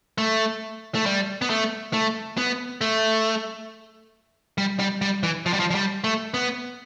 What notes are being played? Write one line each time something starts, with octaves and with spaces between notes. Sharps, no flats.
A3
A3
G3
B3
A3
A3
B3
A3
G3
G3
G3
E3
F3
G3
F3
F3
G3
A3
B3